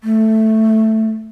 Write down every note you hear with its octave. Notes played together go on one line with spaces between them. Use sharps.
A3